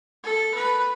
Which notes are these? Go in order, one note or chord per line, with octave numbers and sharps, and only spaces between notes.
A4
B4